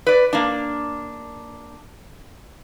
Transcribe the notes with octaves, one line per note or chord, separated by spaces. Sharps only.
B4 D5
A#3 D4